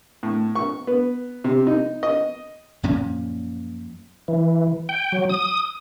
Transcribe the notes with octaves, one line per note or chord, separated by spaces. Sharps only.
A2
C#6
B3
C3
D#4
D#5
F#2 A#2 F3 C#4
E3
G5
F#3
D#6